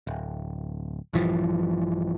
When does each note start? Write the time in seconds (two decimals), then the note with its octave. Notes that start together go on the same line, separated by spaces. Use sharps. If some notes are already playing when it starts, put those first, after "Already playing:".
0.07 D1
1.13 A#1 G2 E3 F3